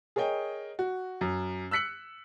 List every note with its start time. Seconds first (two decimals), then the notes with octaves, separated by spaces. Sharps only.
0.16 G#4 A#4 C#5 D#5 G5
0.79 F#4
1.21 F#2
1.71 E6 F#6 B6 C#7 F#7